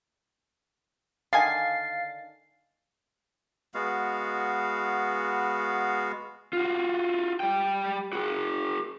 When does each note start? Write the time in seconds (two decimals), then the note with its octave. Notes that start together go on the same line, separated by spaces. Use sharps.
1.33 D3 D#3 F5 G#5 A6 C7
3.74 G#3 B3 F#4 F5
6.53 F4 F#4
7.40 G3 G5
8.13 F#4 G#4